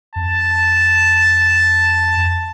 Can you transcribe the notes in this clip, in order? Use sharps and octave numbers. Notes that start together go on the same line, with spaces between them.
F2 A5